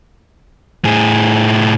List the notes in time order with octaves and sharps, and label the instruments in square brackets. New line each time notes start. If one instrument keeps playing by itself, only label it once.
[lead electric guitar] A2 G#4